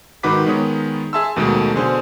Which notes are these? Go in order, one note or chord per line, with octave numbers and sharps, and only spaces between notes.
G#2 D#3 F#4 B4 D6 B6
D#3 G#3 B3 C#5 D#6
G#4 E5 A5 C6 E6
D#2 B2 D#3 F#3 G#3 A3
B2 D3 G#4 C5